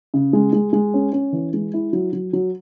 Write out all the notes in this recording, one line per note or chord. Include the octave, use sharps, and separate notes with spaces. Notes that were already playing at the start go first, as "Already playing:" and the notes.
C#3
G#3
G#3
G#3
C#4
C#4
E3
G#3
E4
F#3
F#3
F#3